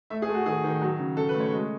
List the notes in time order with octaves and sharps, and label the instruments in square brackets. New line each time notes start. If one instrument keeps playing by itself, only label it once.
[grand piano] A3 E5
G#4
A3
F#4
D#3 G#4
D#3
F#3
C#3
C#3 A4
B4
A3
C#5
G#3